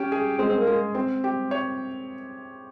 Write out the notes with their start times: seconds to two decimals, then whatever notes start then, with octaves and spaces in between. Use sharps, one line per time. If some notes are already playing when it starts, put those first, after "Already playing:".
Already playing: C#4 G4
0.12 G#4
0.39 G#3 C4
0.49 C4
0.58 A#3
0.67 G#3
0.95 C4
1.24 G4
1.51 C#5